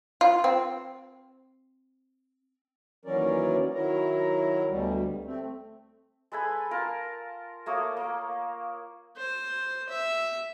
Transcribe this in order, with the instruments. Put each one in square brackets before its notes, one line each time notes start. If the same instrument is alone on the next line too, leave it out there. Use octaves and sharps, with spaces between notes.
[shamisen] F4
C4
[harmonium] D#2 E3 F#3 C#4 A#4 D5
D#3 F#3 E4 A#4 A#5
D2 B2 G3
A3 C4
[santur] G#3 A4 B4 G#5
F4 A#4 A5
A3 A#3 C#5 D#6
A#3
[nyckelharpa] C5
E5